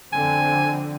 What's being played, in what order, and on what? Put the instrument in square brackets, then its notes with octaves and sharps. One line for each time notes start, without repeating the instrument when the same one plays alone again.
[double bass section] F2 D3 C4 [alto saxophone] G#5